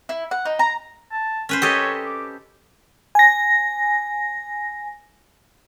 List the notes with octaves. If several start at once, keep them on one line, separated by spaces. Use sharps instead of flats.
E4
F#5
D#4
A#5
A5
C#4 B4 C5
G4 A4 C#5 D#5
D6
G#5 A#6